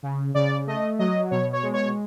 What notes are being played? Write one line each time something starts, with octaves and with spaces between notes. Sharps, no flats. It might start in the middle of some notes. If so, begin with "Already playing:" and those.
C#3
C#3 D5
A3 D#5
F#3 D#5
B2 C#5
C#5
G#3
C#5